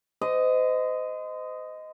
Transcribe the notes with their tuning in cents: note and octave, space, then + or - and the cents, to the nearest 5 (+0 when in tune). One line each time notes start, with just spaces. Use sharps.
C5 -35 D#5 +0